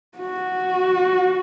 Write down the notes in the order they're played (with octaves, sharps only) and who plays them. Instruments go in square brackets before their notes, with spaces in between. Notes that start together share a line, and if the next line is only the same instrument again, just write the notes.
[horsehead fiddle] F#4